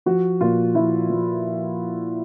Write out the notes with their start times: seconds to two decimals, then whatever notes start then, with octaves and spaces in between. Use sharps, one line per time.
0.06 F3 F#4
0.41 A#2 F4
0.75 F3 E4
1.10 F3